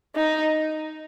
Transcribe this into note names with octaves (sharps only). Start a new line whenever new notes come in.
D#4